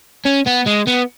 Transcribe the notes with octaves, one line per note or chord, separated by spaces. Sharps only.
C#4
B3
G#3
B3